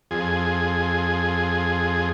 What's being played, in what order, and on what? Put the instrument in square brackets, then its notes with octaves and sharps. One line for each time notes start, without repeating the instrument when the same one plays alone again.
[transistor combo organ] F2 G#4